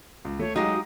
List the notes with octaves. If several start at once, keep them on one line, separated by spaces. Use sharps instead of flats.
C#2
A3 C#5
F#3 G#3 D#4 G4 F5 D#6 A#6